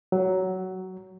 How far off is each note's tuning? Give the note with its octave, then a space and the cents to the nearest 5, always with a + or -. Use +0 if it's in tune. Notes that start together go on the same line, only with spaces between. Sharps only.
F#3 +15